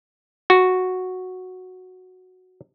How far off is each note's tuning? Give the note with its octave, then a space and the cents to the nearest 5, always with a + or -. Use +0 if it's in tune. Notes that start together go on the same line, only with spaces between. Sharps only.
F#4 -5